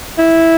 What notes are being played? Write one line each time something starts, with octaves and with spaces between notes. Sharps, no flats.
E4